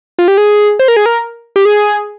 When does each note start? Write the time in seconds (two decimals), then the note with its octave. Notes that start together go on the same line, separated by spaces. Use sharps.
0.19 F4
0.28 G4
0.38 G#4
0.79 C5
0.88 A#4
0.97 G#4
1.06 A#4
1.56 G4
1.65 G#4